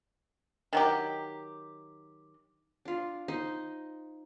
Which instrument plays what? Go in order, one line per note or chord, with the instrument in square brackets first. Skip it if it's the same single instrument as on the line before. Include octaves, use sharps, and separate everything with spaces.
[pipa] D#3 F#3 G4
[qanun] D4 F4
D#4 C5 D#5